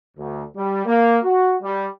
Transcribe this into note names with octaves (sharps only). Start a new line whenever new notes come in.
D2
G3
A#3
F#4
G3